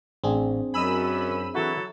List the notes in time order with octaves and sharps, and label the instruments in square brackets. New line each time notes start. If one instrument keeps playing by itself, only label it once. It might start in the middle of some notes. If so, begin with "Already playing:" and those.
[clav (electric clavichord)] A1 [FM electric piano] C4 D4 G#4
[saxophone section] F#2 [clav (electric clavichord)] D#5 G#5 [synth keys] B5 E6 D#7
[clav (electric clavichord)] E3 F#4 [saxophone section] F#3 E4 A4